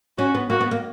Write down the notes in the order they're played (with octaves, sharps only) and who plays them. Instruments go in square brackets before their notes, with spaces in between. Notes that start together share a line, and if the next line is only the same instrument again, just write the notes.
[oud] C#4 [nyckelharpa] F#4
[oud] B3
[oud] A#3 [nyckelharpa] F#4
[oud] B3
A#3